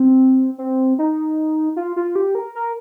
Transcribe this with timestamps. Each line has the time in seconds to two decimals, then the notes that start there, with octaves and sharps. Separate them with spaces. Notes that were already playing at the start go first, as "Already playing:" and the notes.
Already playing: C4
0.58 C4
0.99 D#4
1.76 F4
1.96 F4
2.15 G4
2.35 A#4
2.55 A#4